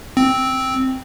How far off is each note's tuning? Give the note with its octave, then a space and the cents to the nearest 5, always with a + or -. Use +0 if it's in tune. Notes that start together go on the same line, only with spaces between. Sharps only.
C4 +0